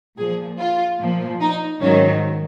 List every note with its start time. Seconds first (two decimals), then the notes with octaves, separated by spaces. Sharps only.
0.16 A#2 F3 G#4
0.58 F4
0.99 A#2 F3
1.39 D#4
1.81 G#2 D#3 F#3 C#4